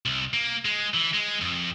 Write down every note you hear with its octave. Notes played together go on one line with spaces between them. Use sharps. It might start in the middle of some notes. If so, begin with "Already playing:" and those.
C2
A#3
G#3
E3
G#3
F2